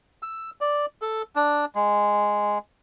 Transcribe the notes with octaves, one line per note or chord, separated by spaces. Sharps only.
E6
D5
A4
D4
G#3